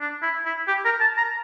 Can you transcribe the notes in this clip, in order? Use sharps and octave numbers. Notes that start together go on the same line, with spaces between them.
D4
E4
E4
G4
A#4
A5
A#5